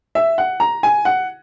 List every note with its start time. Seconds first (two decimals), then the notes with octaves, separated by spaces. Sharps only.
0.15 E5
0.38 F#5
0.60 A#5
0.83 G#5
1.05 F#5